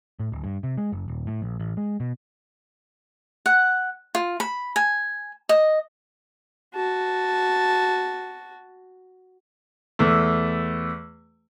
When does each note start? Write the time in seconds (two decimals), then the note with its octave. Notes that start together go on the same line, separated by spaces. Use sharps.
0.20 A2
0.32 D1
0.44 G2
0.63 C3
0.77 G#3
0.92 F#1
1.08 D#1
1.27 A2
1.42 A#1
1.60 A1
1.77 G#3
2.00 B2
3.46 F#5
4.15 F4
4.40 B5
4.76 G#5
5.49 D#5
6.75 F#4 A5
9.99 E2 A3